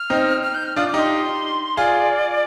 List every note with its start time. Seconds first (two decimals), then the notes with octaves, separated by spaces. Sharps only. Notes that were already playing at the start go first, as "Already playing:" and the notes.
Already playing: F6
0.10 C4 D#4
0.43 F6
0.54 G6
0.66 F6
0.76 D4 F4 D#6
0.88 D6
0.94 D#4 G4
0.99 C6
1.77 F4 G#4 D5